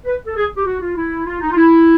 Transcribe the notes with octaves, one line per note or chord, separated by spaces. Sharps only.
B4
A4
G#4
G4
F#4
F4
E4
F4
D#4
F4
E4